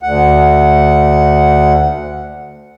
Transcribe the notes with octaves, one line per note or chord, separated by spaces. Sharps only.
D2 F#5